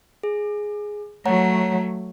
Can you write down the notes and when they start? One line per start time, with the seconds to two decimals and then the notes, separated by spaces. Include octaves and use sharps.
0.23 G#4
1.26 F#3 A3 C#5 F#5 A#5